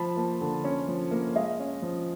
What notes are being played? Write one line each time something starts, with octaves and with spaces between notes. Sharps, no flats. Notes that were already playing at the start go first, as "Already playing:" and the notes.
Already playing: F3 A5 B5
A#3
D3
C#4
F3
A#3
G#3 D#5 F5
C#4
F3